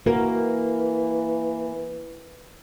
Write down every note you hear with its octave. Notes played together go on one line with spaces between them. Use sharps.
E3 A#3 F#4 A#4